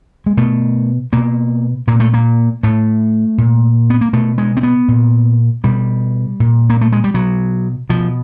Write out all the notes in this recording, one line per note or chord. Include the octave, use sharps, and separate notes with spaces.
G#3
B2 A3
B2 A#3
A#2 A#3
A3
A#3
A2 A3
A#2
B3
A#3
B2 A3
G#3
C4
B3
A#2
B2 G3
A#2
A#3
A3
G#3
G3
B2 F#3
B2 F3